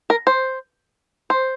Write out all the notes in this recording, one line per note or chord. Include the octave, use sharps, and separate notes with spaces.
A#4
C5
C5